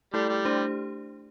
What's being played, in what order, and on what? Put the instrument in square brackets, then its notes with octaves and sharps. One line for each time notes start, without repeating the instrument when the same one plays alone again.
[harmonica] G3 [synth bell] A3 E4 A4 D5
[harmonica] G3
[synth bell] A3 D4 G4 C5